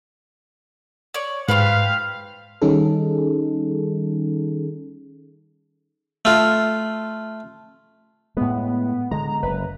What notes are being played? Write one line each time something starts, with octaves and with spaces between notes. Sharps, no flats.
C#5 D5
G#2 F4 G4 B4 F5
D#3 G3 C#4 D#4 G#4 A4
A3 F4
A2 G#3 B3
D3 G#3 A#5
F#1 B4